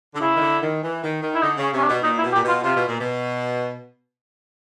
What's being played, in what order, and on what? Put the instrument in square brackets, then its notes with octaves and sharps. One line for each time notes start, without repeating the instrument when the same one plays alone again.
[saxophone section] D3
[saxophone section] C#3 [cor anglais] E4
[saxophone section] D#3
D3
D#3
E3
D#3
D#3
[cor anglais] E4
[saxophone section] D3 [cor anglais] D#4
[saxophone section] C#3 [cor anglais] C#4
[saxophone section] C3
[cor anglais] C#4
D4
[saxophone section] B2
[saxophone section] A#2 [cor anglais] D#4
[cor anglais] E4
[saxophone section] B2
[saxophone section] A#2 [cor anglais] G4
[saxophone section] B2
[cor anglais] F4
[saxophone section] C3 [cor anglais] F4
[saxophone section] B2
A#2
B2